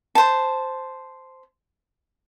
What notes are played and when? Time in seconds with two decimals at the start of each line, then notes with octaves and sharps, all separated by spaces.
0.15 C5 A5